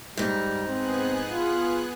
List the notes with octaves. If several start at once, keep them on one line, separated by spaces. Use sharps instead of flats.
G#2 G3 D#4
B3 C4 G#4 F#6
F4